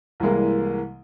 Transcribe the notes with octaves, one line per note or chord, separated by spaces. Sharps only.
C2 E3 G3 G#3 A#3